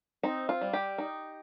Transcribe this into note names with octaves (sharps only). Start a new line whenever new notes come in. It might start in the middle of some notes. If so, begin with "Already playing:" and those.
C4 D#4
F4
G3
G4
D#4